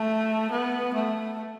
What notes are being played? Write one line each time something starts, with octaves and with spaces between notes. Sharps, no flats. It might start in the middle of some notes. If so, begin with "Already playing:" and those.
Already playing: A3
B3
A3